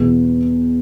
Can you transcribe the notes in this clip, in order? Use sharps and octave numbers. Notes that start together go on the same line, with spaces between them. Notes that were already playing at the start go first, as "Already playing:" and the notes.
Already playing: E2 B2 B3